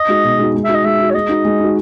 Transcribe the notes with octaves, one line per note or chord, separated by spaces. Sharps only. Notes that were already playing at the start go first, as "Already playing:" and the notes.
Already playing: D#5
G#3 D#4 F#4
B2
G#3 D#4 F#4
G#3
D#4 F#4 E5
D#5
G#3 E5
D#4 F#4
C#5
G#3 D#5
D#4 F#4
G#3
D#4 F#4